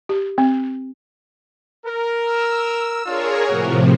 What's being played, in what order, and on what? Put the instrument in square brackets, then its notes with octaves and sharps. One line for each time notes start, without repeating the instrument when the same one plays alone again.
[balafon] G4
C4
[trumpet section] A#4
[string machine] E6
[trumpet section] D4 F4 [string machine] G#4 A#4 C#5
[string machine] A2 C3 F3 [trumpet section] A#3 F#4 A#4